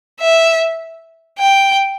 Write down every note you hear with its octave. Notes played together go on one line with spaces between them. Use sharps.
E5
G5